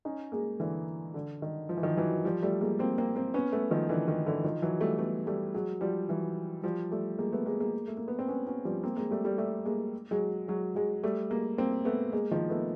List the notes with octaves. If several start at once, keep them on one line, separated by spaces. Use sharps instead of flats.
C#4 D#4
G#3 A#3
D3 E3
D3
D#3
F3
E3
D#3 F3
E3 F#3
F3 G3
G3 A3
G#3 A#3
A#3 C4
A#3 C4
A#3 C4
B3 C#4
A3 B3
D#3 F3
D3 E3
D#3
D3 E3
D#3 F3
E3 F#3
G3 A3
A3 B3
G3 A3
F#3 G#3
F3 G3
E3 F#3
F3 G3
G3 A3
G#3 A#3
A3 B3
G#3 A#3
G#3 A#3
A3
A#3
B3
C4
B3 C#4
B3 C#4
F3 G3
A#3 C4
G#3 A#3
G3 A3
G3 A3
G3 A3
G#3 A#3
F#3 G#3
F#3 G#3
F#3 G#3
G3 A3
G#3 A#3
A#3 C4
A3 B3
G#3 A#3
D#3 F3
A3 B3